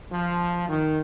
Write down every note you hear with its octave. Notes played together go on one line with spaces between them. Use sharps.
F3
D#3